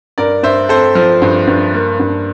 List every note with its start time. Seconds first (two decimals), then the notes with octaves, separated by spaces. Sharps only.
0.18 G2 A#4 D5
0.43 G2 C5 E5
0.69 C4 A4 C5
0.95 F3
1.22 G2
1.47 G2
1.74 A#3
2.00 G2